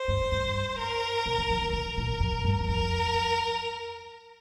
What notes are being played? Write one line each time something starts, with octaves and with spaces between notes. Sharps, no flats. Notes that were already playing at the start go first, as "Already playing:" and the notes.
Already playing: C5
G2
G2
A#4
C3
D3
F3
D3
C3 A#4
A#2
F2
G2
G2
F2 A#4